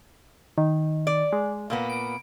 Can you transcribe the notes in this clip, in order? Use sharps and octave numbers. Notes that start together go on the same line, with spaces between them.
D#3
D5
G#3
A#2 A#3 B3
D7